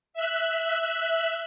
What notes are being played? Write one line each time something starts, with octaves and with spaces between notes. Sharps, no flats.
E5 F#6